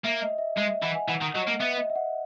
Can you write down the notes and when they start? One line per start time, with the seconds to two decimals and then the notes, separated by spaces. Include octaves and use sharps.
0.04 A#3 E5
0.22 D#5
0.38 E5
0.56 G#3 D#5
0.69 E5
0.83 E3 F#5
0.95 G#5
1.08 E3 F#5
1.21 D#3
1.34 F#3 D#5
1.47 A#3
1.60 B3 E5
1.78 D#5
1.90 E5
1.95 F#5